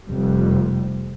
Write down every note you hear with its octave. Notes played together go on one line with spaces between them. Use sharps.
F1 F2 C3 G3